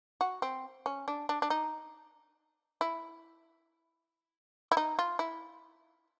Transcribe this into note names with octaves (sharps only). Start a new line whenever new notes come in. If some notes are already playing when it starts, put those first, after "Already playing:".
F#4
C4
C#4
D4
D4
D4
D#4
E4
E4
D#4
F4
E4